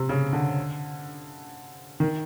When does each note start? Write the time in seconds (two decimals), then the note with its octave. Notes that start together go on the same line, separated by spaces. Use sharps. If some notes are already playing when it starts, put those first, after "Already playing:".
Already playing: C3
0.09 C#3
0.33 D3
2.00 D#3